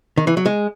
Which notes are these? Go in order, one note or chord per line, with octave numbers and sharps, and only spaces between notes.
D#3
E3
F#3
G#3